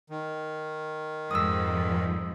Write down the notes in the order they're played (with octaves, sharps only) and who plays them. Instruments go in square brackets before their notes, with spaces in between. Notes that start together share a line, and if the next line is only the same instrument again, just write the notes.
[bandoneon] D#3
[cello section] F2 G#2 F3 [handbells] D#6 E6